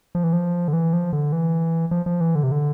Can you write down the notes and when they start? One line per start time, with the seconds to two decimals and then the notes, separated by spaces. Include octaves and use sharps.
0.15 F3
0.24 E3
0.33 F3
0.68 D3
0.73 E3
0.93 F3
1.13 D3
1.32 E3
1.91 F3
2.06 F3
2.21 E3
2.35 D3
2.43 C3
2.52 D3